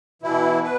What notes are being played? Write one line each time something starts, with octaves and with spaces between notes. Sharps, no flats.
B2 E3 E4
B4